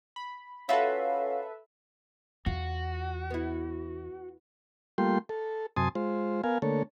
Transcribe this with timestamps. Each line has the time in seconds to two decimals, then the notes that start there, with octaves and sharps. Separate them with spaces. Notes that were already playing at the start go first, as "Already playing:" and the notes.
0.16 B5
0.69 C#4 F4 F#4 A4 B4 E5 F5
2.46 E2 F4 F#4
3.30 B3 E4
4.98 G3 A3 A#3 F4 G5 C6
5.29 A4
5.76 F#2 C3 G#5 A5 C6 D#6
5.95 G#3 F4 C5
6.44 B3 A#4 F5 G#5
6.62 D3 A3 A#3 A4 C#5